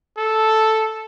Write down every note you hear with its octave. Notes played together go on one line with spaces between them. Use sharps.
A4